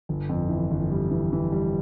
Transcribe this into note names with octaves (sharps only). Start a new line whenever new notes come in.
G1
F2
E3
G1
G3
E3
E3
G3